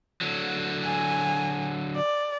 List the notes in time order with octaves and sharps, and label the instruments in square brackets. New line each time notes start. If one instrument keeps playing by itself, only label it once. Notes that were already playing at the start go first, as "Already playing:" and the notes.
[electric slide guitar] D3 F#3
[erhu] G#5
D5